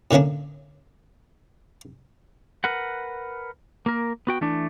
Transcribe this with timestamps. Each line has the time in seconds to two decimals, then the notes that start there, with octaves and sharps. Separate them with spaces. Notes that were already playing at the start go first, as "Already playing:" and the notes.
0.11 A2 D3 A#3 C#4 D4
2.64 A#4 B4 F#5
3.86 A#3 A#4
4.27 B3 F#4 G5
4.41 E3 A3 D4